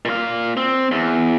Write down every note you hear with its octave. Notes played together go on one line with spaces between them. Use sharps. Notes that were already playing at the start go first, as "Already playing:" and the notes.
A#2 F5
C4
E2